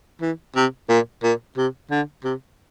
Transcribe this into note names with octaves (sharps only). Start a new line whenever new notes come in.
E3
C3
A#2
A#2
C3
D3
C3